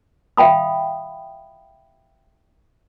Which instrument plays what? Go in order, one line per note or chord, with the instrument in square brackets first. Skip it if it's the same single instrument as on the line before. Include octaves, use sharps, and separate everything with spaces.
[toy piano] E5 F5 G5 B5 D#6